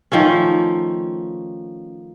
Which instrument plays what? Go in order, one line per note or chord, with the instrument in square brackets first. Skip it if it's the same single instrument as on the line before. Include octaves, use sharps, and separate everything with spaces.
[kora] D#3 F3 A3 C#4